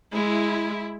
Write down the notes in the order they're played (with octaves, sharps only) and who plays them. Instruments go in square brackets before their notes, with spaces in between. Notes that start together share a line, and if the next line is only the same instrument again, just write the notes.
[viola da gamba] G#3 [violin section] E4